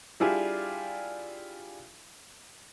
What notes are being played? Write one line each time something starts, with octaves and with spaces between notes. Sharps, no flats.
G3 D4 E4 F4 G4 G#4